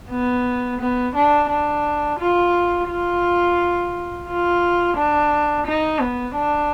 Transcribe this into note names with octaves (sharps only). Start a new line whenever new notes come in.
B3
B3
D4
D4
F4
F4
F4
D4
D#4
B3
D4